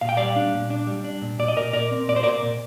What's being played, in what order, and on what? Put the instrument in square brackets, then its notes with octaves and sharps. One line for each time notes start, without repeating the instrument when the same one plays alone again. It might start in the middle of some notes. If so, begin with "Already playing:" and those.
[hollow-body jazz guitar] A#2 F5
G5
G3 D5 F5
D4
A#2
D4
G3
D4
A#2
A#2 D5
D#5
A#2 A#4 D5
A#2 A#4 D5
C4
A#2 D5
C5
A#2 A#4 D5
A#2